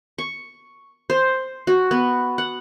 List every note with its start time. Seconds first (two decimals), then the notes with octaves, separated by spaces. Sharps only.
0.18 C#6
1.10 C5
1.67 F#4
1.91 B3
2.38 F#5